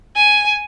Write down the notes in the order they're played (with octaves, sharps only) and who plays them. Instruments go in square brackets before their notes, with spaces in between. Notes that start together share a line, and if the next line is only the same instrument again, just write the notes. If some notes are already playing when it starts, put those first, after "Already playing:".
[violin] G#5